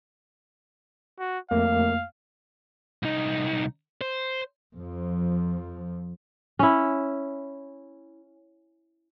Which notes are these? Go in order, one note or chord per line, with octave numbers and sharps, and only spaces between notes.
F#4
F2 A3 A#3 F5
C2 D#4
C5
F2 F3
C#4 E4